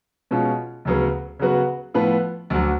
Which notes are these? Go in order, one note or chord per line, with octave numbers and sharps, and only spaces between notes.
B2 G#3 C#4 F4
D2 C#3 F#3 B3
C#3 F#3 B3 F#4
A2 F3 B3 F4 B4
D2 D3 F#3